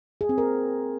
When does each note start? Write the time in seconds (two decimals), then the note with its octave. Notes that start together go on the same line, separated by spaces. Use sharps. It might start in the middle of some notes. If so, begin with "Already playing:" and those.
0.21 G#4
0.29 C4
0.38 A#4